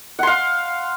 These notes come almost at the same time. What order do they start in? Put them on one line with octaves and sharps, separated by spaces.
F#5 C6 F5